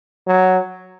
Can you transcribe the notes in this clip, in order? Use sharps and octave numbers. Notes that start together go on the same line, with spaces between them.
F#3